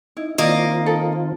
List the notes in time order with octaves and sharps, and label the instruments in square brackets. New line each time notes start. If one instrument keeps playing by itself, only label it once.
[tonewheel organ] D#4 [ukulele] E4
[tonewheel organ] D#3 C4 F4 [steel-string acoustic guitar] A#3 D#5 [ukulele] E4 D5
[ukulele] D#4 A4